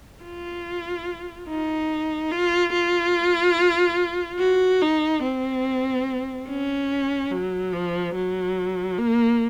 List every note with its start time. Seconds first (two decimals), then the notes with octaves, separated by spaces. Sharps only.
0.24 F4
1.48 D#4
2.31 F4
2.73 F4
4.39 F#4
4.82 D#4
5.23 C4
6.48 C#4
7.31 F#3
7.72 F3
8.15 F#3
8.98 A#3